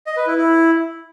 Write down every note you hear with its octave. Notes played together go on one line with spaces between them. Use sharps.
D#5
B4
E4
E4